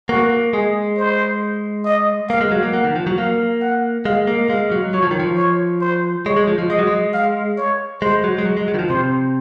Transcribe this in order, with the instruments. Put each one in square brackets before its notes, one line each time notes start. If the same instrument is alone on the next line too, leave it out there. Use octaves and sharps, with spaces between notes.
[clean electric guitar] A#3 [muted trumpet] F#4
[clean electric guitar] G#3 [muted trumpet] G#4
[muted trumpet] C5
D#5
[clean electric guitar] A#3 [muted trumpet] F5
[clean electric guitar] G#3
F#3
A#3
[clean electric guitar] A#3 [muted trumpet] F#5
[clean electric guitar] D#3
F3
F#3
[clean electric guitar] A#3 [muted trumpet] F5
[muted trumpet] F#5
[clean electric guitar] G#3 [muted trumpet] F5
[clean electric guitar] A#3
[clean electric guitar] G#3 [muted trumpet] F5
[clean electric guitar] F#3
[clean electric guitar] F#3 [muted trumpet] C#5
[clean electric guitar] F3
D#3
F3
[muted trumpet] C#5
C5
[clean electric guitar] G#3 [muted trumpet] C#5
[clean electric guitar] G#3
F3
F3
[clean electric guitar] G#3 [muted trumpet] D#5
[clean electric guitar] F#3
G#3
[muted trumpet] F5
C#5
[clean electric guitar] G#3 [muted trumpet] C5
[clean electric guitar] F#3
G#3
F#3
G#3
F#3
D#3
F3
[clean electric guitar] C3 [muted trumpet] C5